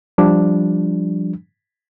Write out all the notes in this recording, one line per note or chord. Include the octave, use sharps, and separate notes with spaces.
F3 G3 D4